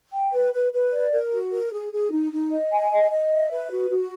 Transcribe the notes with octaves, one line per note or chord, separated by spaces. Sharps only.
G5
B4
B4
B4
D5
A#4
F#4
A#4
G#4
G#4
D#4
D#4
D#5
G#5
D#5
D#5
E5
B4
F#4
F#4